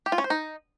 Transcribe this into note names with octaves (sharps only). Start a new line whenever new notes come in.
G4
F4
C#4
C5
D#4